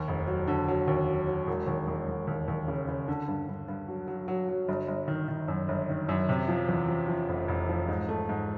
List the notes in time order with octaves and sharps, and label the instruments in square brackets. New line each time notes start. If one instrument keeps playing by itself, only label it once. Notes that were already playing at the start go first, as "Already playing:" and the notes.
Already playing: [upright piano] D#2
F1
F#3
D3
F#3
D#2
F#3
F#3
E1
D#2
E1
E1
D#2
D#2
C#3
C#3
D3
G2
G2
G2
F#3
F#3
F#3
F#3
G1
G1
D#3
D#3
F#2
G1
D#3
F#2
C3
F3
E2
F3
F3
F1
F1
F3
G#2
A3
G#2